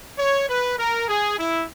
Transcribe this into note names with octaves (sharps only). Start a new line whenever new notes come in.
C#5
B4
A#4
G#4
E4